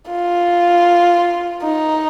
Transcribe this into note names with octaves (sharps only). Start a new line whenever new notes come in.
F4
D#4